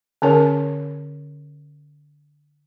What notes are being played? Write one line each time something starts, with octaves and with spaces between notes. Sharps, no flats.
D3 C#4 A#4 C#5